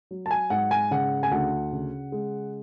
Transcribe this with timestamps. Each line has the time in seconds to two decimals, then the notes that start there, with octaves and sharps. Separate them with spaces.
0.11 F#3
0.26 A5
0.31 G#5
0.50 G#2 F#5
0.71 G#5
0.91 C#3 F#5
1.23 G#5
1.31 D2 F#5
1.72 C#3
2.12 G#3